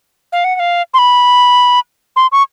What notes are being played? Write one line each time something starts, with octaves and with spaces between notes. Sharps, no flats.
F5
F#5
F#5
F5
C6
B5
C6
C#6